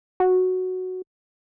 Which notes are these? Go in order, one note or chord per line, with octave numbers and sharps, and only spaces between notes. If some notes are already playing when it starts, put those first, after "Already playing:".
F#4